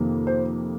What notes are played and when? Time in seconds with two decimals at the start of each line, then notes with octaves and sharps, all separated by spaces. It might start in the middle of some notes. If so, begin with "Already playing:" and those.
Already playing: F2 C3 D#3 A#3
0.27 C5